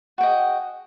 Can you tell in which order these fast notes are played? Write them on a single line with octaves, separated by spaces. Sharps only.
F#4 G5 D#5 G#4